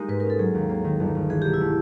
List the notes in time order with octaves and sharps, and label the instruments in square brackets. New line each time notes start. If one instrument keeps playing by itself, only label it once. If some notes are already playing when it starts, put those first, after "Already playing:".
Already playing: [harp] G#3 A#3 D#4 [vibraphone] G4
[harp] G#2 [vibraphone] B4
[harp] C#4 [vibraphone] A#4
[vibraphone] A4
[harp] F#3 [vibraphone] G#4
[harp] D#2
A#3
D#3
G1
G1
[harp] E3 [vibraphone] G#4
[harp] B1 [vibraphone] G4
[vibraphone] E4
[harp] A3